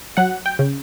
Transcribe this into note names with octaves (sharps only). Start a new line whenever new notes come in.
F#3 F#5
G5
C#3